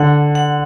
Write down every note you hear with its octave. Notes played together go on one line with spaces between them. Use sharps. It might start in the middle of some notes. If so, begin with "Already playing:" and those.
Already playing: D3 F#5
F#5